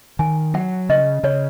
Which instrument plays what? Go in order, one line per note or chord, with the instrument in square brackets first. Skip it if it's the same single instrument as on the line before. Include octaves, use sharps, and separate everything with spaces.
[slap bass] D#3 [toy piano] G#5
[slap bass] F#3 [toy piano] F#5
[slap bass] C#3 [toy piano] D#5
[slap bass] C#3 [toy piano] C#5